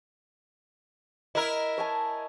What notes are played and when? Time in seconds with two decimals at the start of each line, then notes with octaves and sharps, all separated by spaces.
1.35 E4 A#4 D#5
1.78 C#5 G#5 A5